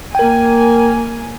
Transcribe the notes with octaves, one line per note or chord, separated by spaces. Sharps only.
A#3 A#4 G5 G#5